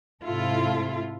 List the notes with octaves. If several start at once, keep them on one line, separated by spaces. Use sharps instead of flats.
G#2 C3 E4 F4 A4